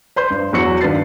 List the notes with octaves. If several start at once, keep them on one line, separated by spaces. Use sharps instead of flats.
B4 C5 C6 G6
G2
E2 F#3 F#4 C#7
G2 D#3 B4 A6 C7